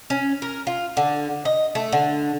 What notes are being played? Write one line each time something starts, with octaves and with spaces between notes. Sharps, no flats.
C#4
A#4
F4
D3
D#5
A3
D3